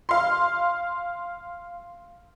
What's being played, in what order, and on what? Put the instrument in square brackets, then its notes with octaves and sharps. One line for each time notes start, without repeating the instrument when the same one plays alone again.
[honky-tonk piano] F5 C6